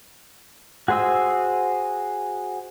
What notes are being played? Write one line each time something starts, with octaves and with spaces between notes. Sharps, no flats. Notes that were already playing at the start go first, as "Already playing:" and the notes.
F#4 G#4 C5 D#5 E6